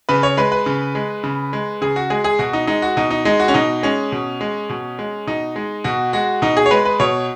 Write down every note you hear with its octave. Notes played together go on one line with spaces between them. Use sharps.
C#3 B4
C#5
G#3 B4
B4
C#3
G#3
C#3
G#3
C#3 G#4
F#4
G#3 G#4
G#4
B2 F#4
D#4
G#3 D#4
F#4
B2 D#4
D#4
G#3 D#4
F#4
C#4
B2 D#4
G#3 C#4
B2
G#3
B2
G#3
B2 D#4
G#3
B2 F#4
G#3 F#4
B2 D#4
G#4
C#5
G#3 B4
B4
B2 C#5